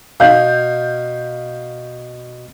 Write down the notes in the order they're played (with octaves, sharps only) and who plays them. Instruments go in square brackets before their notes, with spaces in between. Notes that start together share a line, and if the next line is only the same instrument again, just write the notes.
[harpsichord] B2 [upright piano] F5 G6